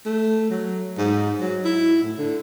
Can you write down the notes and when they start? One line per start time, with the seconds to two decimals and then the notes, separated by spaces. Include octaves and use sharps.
0.05 A3
0.50 F#3
0.98 G#2
1.41 F#3
1.65 E4
2.03 A2
2.18 D3